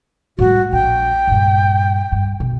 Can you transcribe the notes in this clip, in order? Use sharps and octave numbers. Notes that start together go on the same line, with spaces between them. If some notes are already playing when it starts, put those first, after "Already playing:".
A2 G3 F#4
A#1 G5
G2 A#2
G2
B2